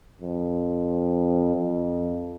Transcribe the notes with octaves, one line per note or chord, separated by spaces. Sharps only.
F2
F2